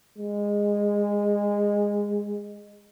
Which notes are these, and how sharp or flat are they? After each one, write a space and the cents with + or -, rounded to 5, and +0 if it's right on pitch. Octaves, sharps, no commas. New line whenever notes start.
G#3 -15